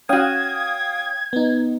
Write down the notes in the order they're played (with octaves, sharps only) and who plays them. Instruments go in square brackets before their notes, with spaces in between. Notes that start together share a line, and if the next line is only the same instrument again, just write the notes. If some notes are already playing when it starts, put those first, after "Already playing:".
[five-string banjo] C#4 F#4 [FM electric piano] F5 G5 D#6 [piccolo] G#6
[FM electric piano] B3 D#4